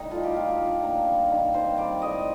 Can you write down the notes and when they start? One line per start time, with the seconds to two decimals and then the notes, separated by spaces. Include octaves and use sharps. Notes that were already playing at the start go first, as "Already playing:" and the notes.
Already playing: A2 G3 D#4
0.11 A3 F4
0.23 G4
0.35 F3 F4
0.58 D4
0.83 A#3
1.06 G3
1.30 D#3
1.54 C4 C5
1.77 G3 D5
2.01 A2 D#5